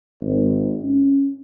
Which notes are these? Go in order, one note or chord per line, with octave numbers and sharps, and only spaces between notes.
G#1
C#4